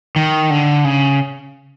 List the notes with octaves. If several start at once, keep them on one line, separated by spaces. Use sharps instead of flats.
D#3
D3
C#3